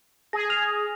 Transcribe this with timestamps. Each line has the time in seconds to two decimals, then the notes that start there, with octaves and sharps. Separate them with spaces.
0.33 G#4 A#6
0.50 F6 F7